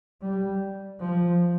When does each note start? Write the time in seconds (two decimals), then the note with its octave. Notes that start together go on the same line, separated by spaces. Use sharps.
0.22 G3
1.00 F3